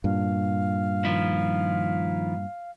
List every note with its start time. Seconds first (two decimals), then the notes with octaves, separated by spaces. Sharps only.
0.04 G2 A#2 F5
1.05 D#3 F3 E4